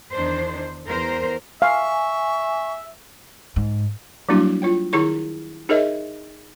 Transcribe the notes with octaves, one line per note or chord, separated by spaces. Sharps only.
E2 D#3 D4 C5
E2 A#4 C5
E5 F5 G#5 C#6
G#2
F#3 G3 A#3 D4 E4 F#4
F4 C#5 G5
D#3 E4 G#4 C#5 C#6
D#4 G#4 A#4 C#5 D#5 E5